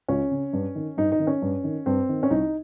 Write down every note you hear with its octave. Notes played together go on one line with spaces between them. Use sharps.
C#2 C#4
C#3
G2
D#3
G2 D#4
D#4
D#3
C#4
G2
D#3
G2 C4
D#3
C#4
C2 D#4